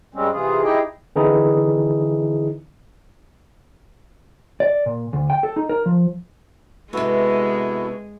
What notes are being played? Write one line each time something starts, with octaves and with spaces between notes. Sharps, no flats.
G2 G3 G#3 C4 C#4
C3 E3 F4 G#4
D#4 E4 G4 G#4 D#5 G5
D3 E3 C4 D#4 E4 G#4
D5
A#2
D2
G5
A4
D#4
A#4
F3
C3 G#3 B3 E4 F#4 A4